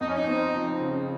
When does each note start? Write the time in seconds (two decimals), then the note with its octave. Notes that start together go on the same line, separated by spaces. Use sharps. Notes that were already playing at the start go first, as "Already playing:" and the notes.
0.01 F2 D#4
0.08 C#4
0.16 D#4
0.28 C4
0.54 F3
0.80 C#3